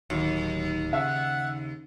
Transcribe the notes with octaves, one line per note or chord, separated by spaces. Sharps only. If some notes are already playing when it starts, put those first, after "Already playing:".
D1 D#2 F#3
C#3 E5 F#5